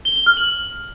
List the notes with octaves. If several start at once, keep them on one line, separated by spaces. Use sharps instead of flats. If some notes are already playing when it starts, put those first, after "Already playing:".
G7
G7
F6
F#7